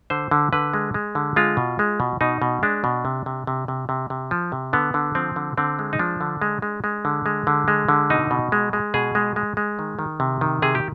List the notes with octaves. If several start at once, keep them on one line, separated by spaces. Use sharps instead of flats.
D3 C5
D3
D3 B4
G#3
G#3
D3
G#3 F4
B2
G#3
B2
B2 D#4
B2
G#3 D4
B2
C3
C3
C3
C3
C3
C3
F3
C3
D3 B3
D3
F3 C4
D3
D3 C4
G#3
D#4
F3 D4
D3
G#3
G#3
G#3
D3
G#3
D3
G#3
D3
B2 D#4
B2
G#3
G#3
B2 G#4
G#3
G#3
G#3
D#3
D#3
C3
D#3
C3 G#4
G4